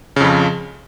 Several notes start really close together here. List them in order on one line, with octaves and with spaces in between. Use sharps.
C#3 F2 F3